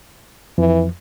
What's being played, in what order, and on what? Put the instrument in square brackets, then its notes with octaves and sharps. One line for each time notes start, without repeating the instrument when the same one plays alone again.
[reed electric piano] F2 [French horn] E3